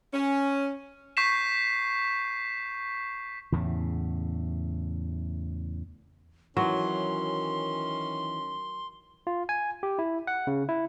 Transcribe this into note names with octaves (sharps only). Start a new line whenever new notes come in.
C#4
C#6 G6 B6 C7 E7
E2 A2 C#3
D#3 E3 F#3 B3 C#4 A#4 C6
F4
G#5
G4
E4
F#5
C#3
E4